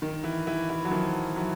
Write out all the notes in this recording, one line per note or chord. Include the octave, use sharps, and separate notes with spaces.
D#3
E3
E3
E3
F#3
D#3 F3
E3 F#3